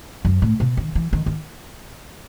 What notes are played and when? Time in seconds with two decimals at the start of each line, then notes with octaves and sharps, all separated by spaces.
0.25 F#2
0.42 A2
0.60 B2
0.77 D#3
0.95 E3
1.13 D#3
1.26 D#3